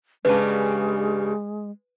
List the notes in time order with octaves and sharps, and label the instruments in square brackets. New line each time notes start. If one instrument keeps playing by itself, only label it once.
[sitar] G2 C#3 G3 [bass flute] G#3 [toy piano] B4 A5